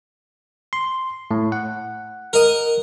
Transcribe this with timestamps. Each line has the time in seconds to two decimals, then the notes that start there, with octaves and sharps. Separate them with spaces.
0.73 C6
1.31 A2
1.52 F#5
2.33 A#4 D#5